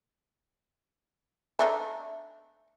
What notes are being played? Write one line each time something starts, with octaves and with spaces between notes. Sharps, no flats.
A3 D4 D#4